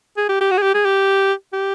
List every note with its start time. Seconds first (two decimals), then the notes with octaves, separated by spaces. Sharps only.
0.17 G#4
0.29 G4
0.41 G4
0.51 F#4
0.57 G#4
0.62 G4
0.74 G#4
0.85 G4
1.53 G4